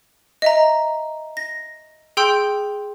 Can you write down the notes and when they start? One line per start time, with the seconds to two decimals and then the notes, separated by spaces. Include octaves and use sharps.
0.42 D#5 E5 A#5
1.37 A#6
2.17 G#4 G5 C6 E6 G6 D7